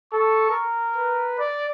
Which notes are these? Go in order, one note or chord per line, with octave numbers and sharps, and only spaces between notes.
A4 C#6
A#4
B4
D5